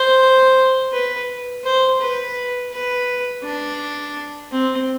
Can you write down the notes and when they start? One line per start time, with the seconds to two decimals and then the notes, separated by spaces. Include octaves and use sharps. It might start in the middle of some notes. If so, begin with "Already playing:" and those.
Already playing: C5
0.92 B4
1.64 C5
2.00 B4
2.72 B4
3.43 D4
4.51 C4